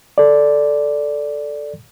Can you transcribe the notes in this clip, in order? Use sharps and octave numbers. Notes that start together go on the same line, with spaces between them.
A4 D5